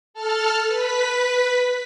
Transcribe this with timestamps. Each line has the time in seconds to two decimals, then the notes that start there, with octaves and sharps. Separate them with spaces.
0.14 A4 A5 F6
0.67 B4 B6